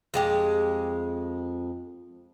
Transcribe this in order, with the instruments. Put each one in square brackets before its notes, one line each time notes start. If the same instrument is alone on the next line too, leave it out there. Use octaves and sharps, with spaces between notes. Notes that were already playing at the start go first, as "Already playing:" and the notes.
[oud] F2 G#3 G4